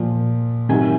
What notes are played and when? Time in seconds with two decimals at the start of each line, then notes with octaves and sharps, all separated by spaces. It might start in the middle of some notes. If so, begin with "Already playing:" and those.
Already playing: A#2 F3
0.69 C3 D#3 F#3 G#5